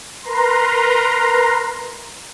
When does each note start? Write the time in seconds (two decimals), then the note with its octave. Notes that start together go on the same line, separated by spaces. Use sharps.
0.23 A#4 B4 A#5 C6